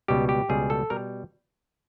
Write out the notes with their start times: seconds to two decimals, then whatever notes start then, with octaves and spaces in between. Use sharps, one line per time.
0.08 C#2 B2 G3 G4
0.29 G4
0.49 C#2 B2 G3 G#4
0.70 A4
0.90 B2 G3 A#4